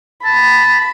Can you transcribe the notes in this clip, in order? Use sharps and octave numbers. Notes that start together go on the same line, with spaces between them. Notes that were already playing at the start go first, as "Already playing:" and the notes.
A5 B5